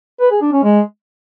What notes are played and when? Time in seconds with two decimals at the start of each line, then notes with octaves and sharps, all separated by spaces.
0.20 B4
0.31 G#4
0.42 D4
0.52 C#4
0.63 G#3